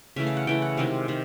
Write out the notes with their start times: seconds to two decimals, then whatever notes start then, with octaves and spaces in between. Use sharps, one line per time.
0.16 C#3 E3 A3 E5
0.27 F5
0.37 F#5
0.47 C#3 E3 A3 G5
0.62 F#5
0.77 C3 D#3 G#3 F5
1.08 C3 D#3